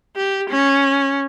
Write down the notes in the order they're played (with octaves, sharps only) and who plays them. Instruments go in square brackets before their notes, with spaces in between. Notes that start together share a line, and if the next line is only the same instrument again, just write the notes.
[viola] G4
C#4